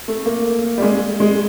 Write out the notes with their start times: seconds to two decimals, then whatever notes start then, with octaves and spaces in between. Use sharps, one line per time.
0.08 A3
0.26 A#3
0.78 G3
0.82 G#3
1.20 G#3